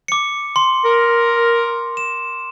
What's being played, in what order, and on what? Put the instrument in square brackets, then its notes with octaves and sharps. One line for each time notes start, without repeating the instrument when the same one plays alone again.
[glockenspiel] D6 C#7
C6
[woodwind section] A#4
[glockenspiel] E7